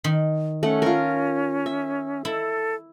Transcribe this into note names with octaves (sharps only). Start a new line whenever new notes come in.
D#3
A3 C#4 F#5
F4 A#4
E5
E4 A4